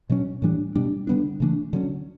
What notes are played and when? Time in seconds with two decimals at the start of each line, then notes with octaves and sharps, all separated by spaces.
0.10 B2 F#3 C#4
0.42 A2 E3 G3 D4
0.75 B2 G3 D4
1.07 D3 G3 B3 D4
1.40 C#3 E3 A3 D4
1.73 D3 F#3 C#4